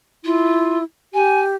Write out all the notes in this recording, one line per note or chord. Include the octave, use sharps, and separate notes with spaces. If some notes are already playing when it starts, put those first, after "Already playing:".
E4 F4
G4 G#5